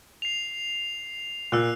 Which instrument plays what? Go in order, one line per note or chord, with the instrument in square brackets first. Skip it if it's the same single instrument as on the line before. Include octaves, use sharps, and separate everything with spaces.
[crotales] C7 F7
[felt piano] A#2 [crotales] E6 F#6